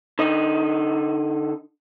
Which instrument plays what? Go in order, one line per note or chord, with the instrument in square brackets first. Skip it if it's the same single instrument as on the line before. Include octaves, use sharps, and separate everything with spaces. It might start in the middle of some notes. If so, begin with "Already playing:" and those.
[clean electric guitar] D3 D#4